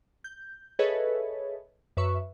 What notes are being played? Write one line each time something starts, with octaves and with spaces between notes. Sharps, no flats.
G6
G#4 A4 B4 C#5 D#5 E5
F#2 B4 E5 C#6